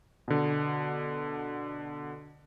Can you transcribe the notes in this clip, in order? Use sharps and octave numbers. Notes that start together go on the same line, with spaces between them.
B2 D3